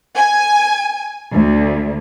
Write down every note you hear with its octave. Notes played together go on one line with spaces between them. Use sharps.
G#5
D2